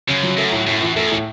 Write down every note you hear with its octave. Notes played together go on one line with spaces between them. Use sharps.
F#2 C#3
F#3
F#2 A3
A2
F#2 A2
E3
F#2 A3
E2
A2